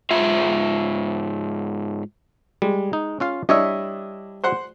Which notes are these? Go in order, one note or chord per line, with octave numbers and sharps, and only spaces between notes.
G#2 F4 E5
G3 G#3
D#4
C#4 F4 F5
G3 D4 E4 C#5 D#5 E5
C5 F#5 C6